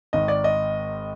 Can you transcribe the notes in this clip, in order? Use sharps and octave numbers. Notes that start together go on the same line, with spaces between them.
G#1 G#2 D#3 D#5
D5
D#5